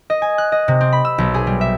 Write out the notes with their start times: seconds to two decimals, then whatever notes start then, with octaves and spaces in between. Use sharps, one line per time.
0.10 D#5
0.22 G#5
0.38 F#6
0.52 D#5
0.68 C3
0.81 C4
0.92 B5
1.05 E6
1.18 B1
1.34 G#4
1.47 G3
1.61 E5